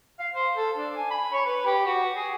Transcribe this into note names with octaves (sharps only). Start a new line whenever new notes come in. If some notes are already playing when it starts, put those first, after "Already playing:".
F5
C5
A4
D4
G#5
B5
C#5
B4
G4
F#4
G#4